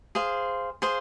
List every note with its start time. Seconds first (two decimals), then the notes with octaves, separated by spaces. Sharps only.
0.15 G#4 C5 F5
0.82 G#4 C5 F5